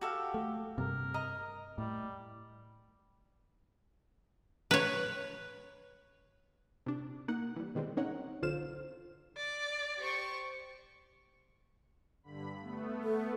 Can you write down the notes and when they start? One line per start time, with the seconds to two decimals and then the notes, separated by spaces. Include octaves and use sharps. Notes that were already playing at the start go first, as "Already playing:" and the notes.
0.01 F#4 G4 A4 F5
0.34 A3
0.78 G2 C3 A#4
1.14 D#5 A#5
1.78 A2 G3
4.71 B4 C#5
6.86 C3 D4
7.28 A#3 D#4 F#5
7.56 E3 G3
7.75 B2 D#3 G3 G#3 C4
7.97 C4 C#4 D#4 A#4 C#5 F#5
8.42 B1 D3 F4 C5 F5 E7
9.37 D5
9.97 G4 C5 C#6
12.23 G2 D3 B5
12.60 A3 B3
13.03 A4